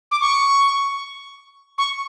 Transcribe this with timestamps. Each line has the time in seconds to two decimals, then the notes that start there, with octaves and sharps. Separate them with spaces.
0.11 D6
0.21 C#6
1.78 C#6